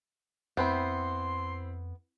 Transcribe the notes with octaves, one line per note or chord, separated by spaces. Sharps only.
F2 B3 C4 E4 G5 B5 C6